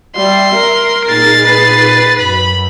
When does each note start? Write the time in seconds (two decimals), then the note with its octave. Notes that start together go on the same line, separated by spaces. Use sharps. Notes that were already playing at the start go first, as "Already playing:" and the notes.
0.16 G3 E5 C6
0.55 A#4
1.06 A#2 D#4 G#4 A6 C7
1.45 B4
2.18 F#2 B5